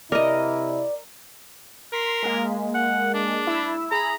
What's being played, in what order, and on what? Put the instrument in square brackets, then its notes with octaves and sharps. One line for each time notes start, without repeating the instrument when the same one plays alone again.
[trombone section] C3 C4 E4 [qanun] A#4 D#5 [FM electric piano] D5
[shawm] A#4 [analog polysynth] C6 B6
[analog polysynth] G#3 A#3
[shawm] F#5
D4
[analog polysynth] E4 E5 E6
[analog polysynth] G#4 B5 [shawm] A#5